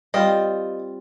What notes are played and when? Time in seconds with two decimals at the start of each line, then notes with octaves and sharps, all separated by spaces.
0.14 G3 C4 F4 D#5